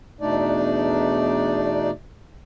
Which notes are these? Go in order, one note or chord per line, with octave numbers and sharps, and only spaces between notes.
E2 B2 A3 D4 D#4 D5